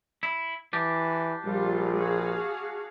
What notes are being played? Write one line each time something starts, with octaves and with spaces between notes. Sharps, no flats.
E4
E3 D4 G4
A#1 G3 F4
F#4 G#4 F5